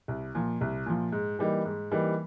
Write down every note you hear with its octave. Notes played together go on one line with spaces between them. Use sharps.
C2
A#2 F3
C2
A#2 F3
G#2
E3 G3 A#3 D#4
G#2
E3 G3 A#3 D#4